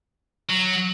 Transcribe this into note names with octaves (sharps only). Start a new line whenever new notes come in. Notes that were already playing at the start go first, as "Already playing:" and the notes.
F#3